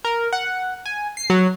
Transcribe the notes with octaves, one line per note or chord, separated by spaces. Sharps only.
A#4
F#5
G#5
C7
F#3